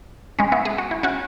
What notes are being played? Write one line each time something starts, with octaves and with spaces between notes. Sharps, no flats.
G#3 C#4
B3 E4
G#4
F#4
E4
C#4 F#4